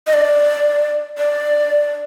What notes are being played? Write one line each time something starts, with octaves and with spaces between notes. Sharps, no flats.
D#5
D5
D5